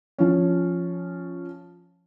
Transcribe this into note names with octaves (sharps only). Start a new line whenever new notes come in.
F3 C#4